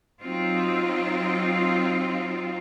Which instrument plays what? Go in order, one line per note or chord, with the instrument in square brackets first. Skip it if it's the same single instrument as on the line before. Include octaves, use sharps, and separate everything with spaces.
[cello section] F#3 C4 D#4 F4